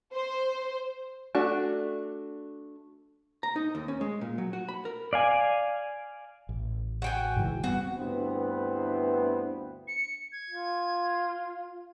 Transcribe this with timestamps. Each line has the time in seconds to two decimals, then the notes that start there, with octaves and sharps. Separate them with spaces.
0.13 C5
1.35 A3 D4 F#4
3.43 A#5
3.56 D#4
3.75 D#2
3.88 C#4
4.01 G#3
4.21 A#2
4.38 F#3
4.53 F#4
4.69 B5
4.85 A#4
5.13 D5 F5 G#5
6.49 A1
7.02 F#4 G5 G#5
7.36 G#2 C#3 E3
7.64 G3 B3 C4 F#4
7.97 D2 G2 B3 C4 E4 B4
9.88 C#7
10.32 G#6
10.50 F4